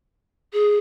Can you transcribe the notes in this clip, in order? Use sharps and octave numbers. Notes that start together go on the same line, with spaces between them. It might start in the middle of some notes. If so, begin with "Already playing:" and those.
G#4